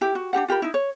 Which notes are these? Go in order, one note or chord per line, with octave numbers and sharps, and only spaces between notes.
E4 G4
F#4
D4 D#4 G4 F#5
F4 G4 A#4 B5
D#4 E4
C#5